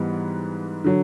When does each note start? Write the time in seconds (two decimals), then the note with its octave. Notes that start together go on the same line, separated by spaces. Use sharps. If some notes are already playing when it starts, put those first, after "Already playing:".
Already playing: G#2 E3 G3 B3
0.84 D3 F#3